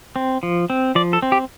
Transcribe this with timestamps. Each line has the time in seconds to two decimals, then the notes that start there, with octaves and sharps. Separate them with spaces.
0.16 C4
0.43 F3
0.70 C4
0.95 F3 D5
1.13 A4
1.22 C4
1.32 G4